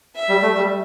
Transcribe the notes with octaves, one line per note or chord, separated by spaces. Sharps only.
E5
G3
A3
G3